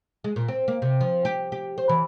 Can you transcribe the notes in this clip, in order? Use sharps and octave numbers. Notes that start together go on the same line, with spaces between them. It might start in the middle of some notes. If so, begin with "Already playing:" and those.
G#3
A#2
C4
A#3
C3
F3
G4
G4
C5
E3